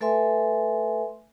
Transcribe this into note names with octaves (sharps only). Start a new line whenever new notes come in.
A3 A4 B4 E5 G#5 C6